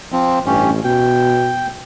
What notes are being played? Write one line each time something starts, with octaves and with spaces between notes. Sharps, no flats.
F3 C4
A1 G2 C#4 G4
B2 G5